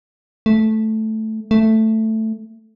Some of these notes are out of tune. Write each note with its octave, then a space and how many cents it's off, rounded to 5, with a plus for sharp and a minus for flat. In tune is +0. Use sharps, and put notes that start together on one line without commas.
A3 -5
A3 +5